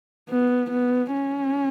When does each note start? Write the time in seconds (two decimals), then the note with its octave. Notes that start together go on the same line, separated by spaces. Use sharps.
0.29 B3
0.71 B3
1.13 C#4